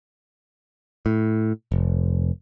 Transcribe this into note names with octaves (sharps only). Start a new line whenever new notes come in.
A2
F1